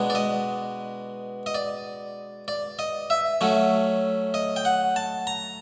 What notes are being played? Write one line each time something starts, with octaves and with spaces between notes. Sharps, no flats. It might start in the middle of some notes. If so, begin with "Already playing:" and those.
Already playing: B2 G#3 B3 D4
D5
D#5
D#5
D5
D5
D#5
E5
F#3 A3 C#4
D#5
G5
F#5
A5
A#5